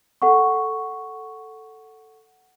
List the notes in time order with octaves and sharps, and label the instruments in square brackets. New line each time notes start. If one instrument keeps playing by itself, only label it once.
[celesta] A4 F#5 C#6